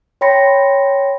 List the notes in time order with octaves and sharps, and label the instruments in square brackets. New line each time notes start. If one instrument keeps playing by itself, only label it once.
[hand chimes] C#5 G5 B5 C6 A#6 C#7